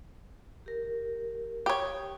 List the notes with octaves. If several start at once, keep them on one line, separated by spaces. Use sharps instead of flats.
G4 A#4
G4 C#5 G5 D#6